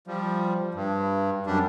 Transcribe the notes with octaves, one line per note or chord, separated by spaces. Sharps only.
F3 G3
G2
F#2 G3 D4